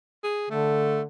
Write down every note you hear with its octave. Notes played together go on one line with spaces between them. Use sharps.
G#4
D3 A3